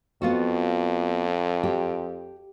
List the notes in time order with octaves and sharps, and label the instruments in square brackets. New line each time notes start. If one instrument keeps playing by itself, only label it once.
[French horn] F2 [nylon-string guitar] B3 F4 F#4
[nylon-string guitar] G4